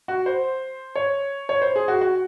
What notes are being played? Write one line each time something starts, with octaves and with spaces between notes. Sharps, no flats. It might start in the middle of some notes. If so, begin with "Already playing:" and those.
F#4
C5
C#5
C#5
C5
G#4
F#4
F#4